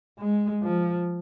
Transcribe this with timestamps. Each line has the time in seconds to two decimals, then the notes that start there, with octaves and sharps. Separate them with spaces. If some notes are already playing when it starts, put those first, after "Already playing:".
0.19 G#3
0.63 F3